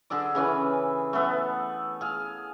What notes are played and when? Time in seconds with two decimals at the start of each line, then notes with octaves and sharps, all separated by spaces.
0.10 D3 G#4 A4 D5
0.35 C#3 E3 C#4 B4
1.13 A3 B3 A4
2.01 G#4 F5